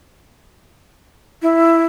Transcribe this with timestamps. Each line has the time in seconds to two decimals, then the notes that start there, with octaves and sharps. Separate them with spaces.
1.42 E4